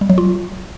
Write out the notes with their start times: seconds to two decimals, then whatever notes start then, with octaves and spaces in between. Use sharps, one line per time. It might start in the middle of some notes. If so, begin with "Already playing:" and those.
0.01 G3
0.10 F#3
0.18 F4